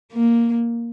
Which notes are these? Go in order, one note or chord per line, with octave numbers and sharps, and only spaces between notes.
A#3